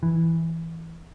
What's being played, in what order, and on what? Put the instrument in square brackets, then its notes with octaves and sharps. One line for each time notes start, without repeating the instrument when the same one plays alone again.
[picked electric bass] E3